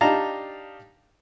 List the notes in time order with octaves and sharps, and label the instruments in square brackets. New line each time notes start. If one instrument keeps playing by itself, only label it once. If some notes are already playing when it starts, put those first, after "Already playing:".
[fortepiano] D4 D#4 G4 F5 A5 A#5